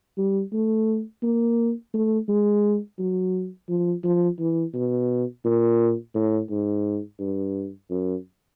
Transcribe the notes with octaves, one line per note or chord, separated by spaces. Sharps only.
G3
A3
A#3
A3
G#3
F#3
F3
F3
E3
B2
A#2
A2
G#2
G2
F#2